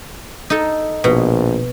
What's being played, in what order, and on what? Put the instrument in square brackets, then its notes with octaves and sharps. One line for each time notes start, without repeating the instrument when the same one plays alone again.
[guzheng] D#4 A4
[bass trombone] A#1 [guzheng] B2